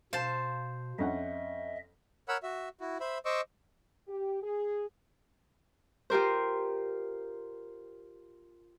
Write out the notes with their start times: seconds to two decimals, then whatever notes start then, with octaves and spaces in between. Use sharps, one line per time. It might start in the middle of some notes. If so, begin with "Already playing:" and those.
0.13 B2 C5 F5 A5
0.99 F2 C#4 D#5 E5 F#5
2.29 A#4 C#5 F#5 B5 E6
2.43 F#4 E5
2.81 E4 F#4
3.00 C5 E5 B5
3.26 C5 D#5 C#6 D6 E6
4.08 G4
4.43 G#4
6.10 F4 G4 A#4 C5